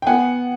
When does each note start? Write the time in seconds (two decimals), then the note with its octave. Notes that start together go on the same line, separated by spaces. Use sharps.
0.02 G5
0.07 B3 F#5 G#5